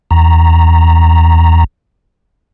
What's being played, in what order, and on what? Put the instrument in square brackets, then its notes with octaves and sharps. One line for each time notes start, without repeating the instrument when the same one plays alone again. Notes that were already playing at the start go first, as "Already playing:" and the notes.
[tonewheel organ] E2 A#5